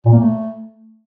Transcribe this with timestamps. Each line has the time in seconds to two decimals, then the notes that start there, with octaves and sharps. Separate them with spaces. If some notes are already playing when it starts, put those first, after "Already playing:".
0.06 A#2
0.13 A#3
0.19 A3